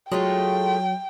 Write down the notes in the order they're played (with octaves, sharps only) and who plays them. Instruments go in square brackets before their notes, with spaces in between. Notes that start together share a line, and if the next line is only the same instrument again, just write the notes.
[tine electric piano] F#3 [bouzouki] G#3 A3 F4 [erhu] G5